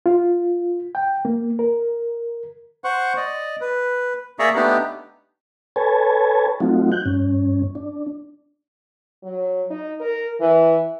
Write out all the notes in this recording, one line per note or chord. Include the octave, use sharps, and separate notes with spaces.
F4
G5
A#3
A#4
C5 F#5 C#6
D5 D#5
B4
A#3 G#4 D5 E5 A#5 C#6
A3 B3 D4 D#4 G4
A4 B4 C#5 G#5 A5
F#3 A3 C4 D#4 F4 F#4
F#6 G6
G2 C#4
D4
F#3
D#4
A#4
E3